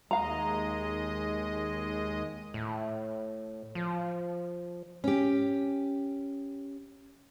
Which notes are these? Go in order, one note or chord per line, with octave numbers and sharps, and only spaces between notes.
D#2 G#3 D#5 F5 A#5
A2
F3
C#4 G4